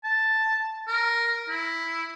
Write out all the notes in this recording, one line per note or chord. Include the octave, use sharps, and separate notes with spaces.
A5
A#4
E4